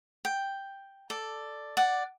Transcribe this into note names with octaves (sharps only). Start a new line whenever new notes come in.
G5
A4 D5
D5 F#5